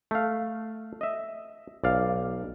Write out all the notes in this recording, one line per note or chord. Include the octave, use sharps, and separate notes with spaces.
A3 F5
D#5 E5
B1 D5 F5